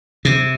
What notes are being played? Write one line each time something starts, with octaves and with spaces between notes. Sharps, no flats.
C3